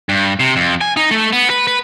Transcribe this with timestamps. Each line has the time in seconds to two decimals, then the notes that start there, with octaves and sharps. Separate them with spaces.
0.09 G2
0.40 C3
0.56 F2
0.81 G#5
0.97 D#4
1.11 A3
1.33 B3
1.50 B4
1.67 B4